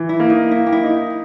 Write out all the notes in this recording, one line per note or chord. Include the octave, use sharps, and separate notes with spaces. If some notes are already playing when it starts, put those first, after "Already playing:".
Already playing: E3
E4
A#3
D#4
A#3 E4
G4
E4
D#4